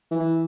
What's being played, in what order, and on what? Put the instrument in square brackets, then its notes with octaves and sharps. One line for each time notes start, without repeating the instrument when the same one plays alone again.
[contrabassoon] E3